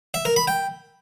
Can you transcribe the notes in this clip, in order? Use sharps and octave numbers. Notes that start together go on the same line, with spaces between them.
E5
A#4
B5
G5